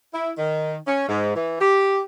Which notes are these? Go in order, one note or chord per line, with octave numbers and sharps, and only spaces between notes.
E4
D#3
C#4
G#2
E3
G4